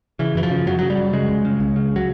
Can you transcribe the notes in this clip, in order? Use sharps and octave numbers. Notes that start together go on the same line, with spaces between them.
C#3 E3
F#2 E3
F3
C#3
F#2 F#3
C#3 F#3
G3
F#2
C#3 G#3
C#2
C#3
C#2
C#3
F#3